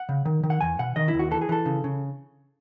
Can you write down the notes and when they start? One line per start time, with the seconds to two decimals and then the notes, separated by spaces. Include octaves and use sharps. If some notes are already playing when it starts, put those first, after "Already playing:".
Already playing: F#5
0.09 C#3
0.25 D#3
0.43 D#3
0.50 F#5
0.61 E2 G#5
0.79 B2 F#5
0.96 D#3 D#5
1.08 E4
1.14 D#2
1.19 F#4
1.31 E3 A4
1.41 G#4
1.49 E3 A4
1.66 C#3
1.84 C#3